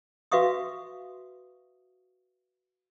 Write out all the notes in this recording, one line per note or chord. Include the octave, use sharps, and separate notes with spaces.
F#4 B4 E5 F5 C#6 D#6